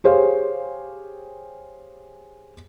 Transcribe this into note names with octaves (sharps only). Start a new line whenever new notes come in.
G4 G#4 C5 C#5 F5